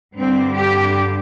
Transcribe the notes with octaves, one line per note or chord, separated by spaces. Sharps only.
G2 D3 G3 C4
G4